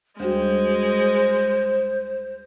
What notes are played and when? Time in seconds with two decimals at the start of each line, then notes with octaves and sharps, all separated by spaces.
0.20 D2 G3 G#3 F#4 C5